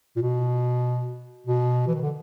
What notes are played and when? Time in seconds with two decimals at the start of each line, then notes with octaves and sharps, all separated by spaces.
0.16 A#2
0.22 B2
1.47 B2
1.87 E3
1.95 D#3
2.02 D3